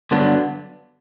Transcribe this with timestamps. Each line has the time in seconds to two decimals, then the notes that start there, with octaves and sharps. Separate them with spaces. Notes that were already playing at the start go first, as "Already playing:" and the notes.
0.11 G2 D3 F#3 B3 D4